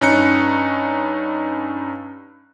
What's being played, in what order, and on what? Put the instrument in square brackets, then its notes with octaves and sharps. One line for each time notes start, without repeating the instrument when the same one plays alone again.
[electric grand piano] G2 C#4 D#4 F#6 C#7